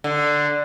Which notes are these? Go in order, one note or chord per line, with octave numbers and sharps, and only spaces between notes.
D3